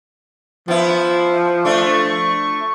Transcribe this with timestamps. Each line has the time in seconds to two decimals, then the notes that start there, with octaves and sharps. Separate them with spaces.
0.68 F3 B3 E4
1.65 A3 D4 C#6